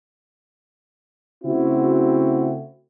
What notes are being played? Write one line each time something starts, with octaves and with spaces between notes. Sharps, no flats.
C#3 A3 C4 E4 F#4